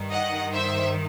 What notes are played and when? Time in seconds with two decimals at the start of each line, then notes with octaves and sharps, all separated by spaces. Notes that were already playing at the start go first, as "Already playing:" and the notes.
Already playing: G2 D#3
0.10 D#5 F#5
0.53 C5 E5